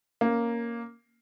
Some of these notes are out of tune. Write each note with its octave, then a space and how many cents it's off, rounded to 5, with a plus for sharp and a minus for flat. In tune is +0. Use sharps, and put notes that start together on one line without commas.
A#3 +0 C#4 +0